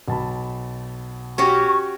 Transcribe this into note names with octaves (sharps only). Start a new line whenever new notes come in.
B1 A5 B5
C#4 F#4 G4 C#6